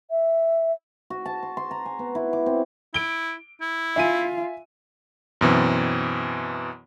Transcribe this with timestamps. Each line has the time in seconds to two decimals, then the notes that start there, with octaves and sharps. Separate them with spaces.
0.11 E5
1.10 F#4
1.25 A5
1.43 C6
1.57 C6
1.71 A#5
1.86 G#5
1.99 B3
2.15 E4
2.33 D6
2.46 C4
2.94 E4 D7 G7
3.61 E4
3.96 F4 E5 G#5 D#7
5.41 F#2 B2 E3 C4